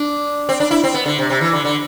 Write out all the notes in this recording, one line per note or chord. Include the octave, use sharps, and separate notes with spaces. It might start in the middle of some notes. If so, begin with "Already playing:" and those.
Already playing: D4
C4
D4
E4
C4
B3
D3
C3
C3
E3
D3
D3